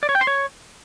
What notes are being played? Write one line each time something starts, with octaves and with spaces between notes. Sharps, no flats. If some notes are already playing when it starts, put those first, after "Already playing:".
D5
C#5
G5
C6
C#5